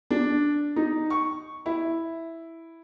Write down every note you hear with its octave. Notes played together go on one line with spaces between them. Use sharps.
D4
D#4
C#6
E4